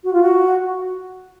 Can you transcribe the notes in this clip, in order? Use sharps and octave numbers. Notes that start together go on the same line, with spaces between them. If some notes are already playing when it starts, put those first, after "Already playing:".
F#4
F4
F#4